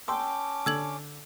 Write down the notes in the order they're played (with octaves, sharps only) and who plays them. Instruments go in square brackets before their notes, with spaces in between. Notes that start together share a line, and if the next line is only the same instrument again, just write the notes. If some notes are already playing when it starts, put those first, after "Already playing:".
[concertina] C#4 D6 [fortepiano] G5 C6 E6 [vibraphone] A5
[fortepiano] D3 [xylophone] E6 G#6 F#7